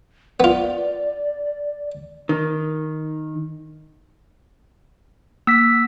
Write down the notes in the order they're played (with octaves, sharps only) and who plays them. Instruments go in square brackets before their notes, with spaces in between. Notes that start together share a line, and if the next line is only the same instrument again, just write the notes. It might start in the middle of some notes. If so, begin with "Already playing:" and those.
[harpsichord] B3 F4 [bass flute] D5
[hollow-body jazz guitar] D#3
[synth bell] A#3 [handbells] E6 B6